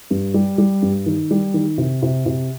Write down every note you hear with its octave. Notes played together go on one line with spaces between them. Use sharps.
G2
G3
G3
G2
D#3
G3
D#3
C3
C3
C3